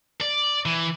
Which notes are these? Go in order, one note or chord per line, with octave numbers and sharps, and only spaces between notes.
D5
E3